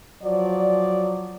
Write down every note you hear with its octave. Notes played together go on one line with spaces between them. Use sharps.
F3 F#3 D5